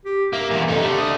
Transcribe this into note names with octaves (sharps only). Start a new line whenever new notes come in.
G4
A#3 E5
E2 A#2
F2 D#4 A4
D3 A3 G4
D#6